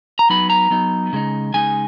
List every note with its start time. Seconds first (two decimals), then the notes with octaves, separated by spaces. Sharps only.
0.19 A#5
0.30 F#3 B3 D#4 B5
0.50 A#5
0.70 F#3 B3 D#4
1.13 C#3 G#3 D#4
1.54 C#3 G#3 D#4 G#5